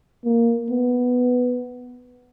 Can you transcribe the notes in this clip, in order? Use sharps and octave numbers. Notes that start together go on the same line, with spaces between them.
A#3
B3